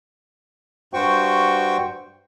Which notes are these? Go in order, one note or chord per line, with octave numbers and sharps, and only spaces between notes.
G2 F#4 C5 G5 C#6